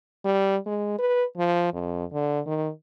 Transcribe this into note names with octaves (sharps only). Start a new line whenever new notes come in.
G3
G#3
B4
F3
F2
D3
D#3